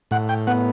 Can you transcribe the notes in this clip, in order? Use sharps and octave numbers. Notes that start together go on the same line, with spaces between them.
A2 F#5
G5
B3 F#5